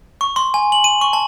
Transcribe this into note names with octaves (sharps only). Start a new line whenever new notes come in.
C#6
C6
G#5
F#7
D#7
C#6
A5